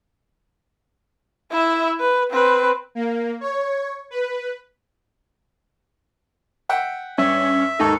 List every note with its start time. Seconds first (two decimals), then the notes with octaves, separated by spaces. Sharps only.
1.51 E4 E5
2.00 B4
2.31 C4 B4
2.95 A#3
3.41 C#5
4.10 B4
6.69 E5 F#5 G5
7.18 G2 C#4 E5
7.80 D#2 G#2 D#4 A4 C#6